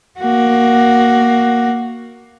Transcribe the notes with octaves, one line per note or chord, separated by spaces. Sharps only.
A#3 F#4